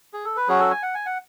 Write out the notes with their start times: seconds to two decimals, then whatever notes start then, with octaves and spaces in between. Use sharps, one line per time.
0.13 G#4
0.25 A4
0.37 B4
0.48 F#3 C#4 F#4 G#4
0.60 A4
0.71 G#5
0.83 F#5
0.95 G#5
1.06 F#5